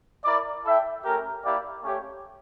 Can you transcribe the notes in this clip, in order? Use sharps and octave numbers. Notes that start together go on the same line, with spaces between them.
E4 A#4 D5
E4 A4 E5 G5
A3 C#4 G4 A#4
A#3 E4 G4 D5 F5
A3 C#4 G4 C#5